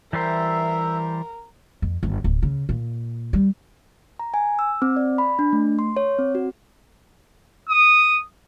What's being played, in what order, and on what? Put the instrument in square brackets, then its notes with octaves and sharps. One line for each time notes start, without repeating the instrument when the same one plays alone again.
[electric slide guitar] E3 G3 C5 [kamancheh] A#4 [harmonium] E5
[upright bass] F2
G1
D1
C#3
A#2
G3
[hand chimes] A#5
G#5
E6
C4
D5
B5
D4
A3
C6
C#5
C4
F#4
[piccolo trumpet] D#6